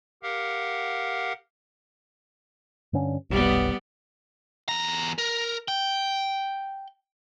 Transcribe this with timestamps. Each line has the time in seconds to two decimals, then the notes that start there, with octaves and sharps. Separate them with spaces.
0.23 G4 A#4 F5 F#5
2.93 G2 D3 C#4
3.30 F1 B1 G3 B3
4.69 E2 A#5
5.18 A#4
5.68 G5